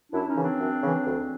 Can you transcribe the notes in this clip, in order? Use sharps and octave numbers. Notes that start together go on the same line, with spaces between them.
F#2 D4 E4
C#4 D#4
C#3 E3
C4 D4
F#2
C#3 E3
D2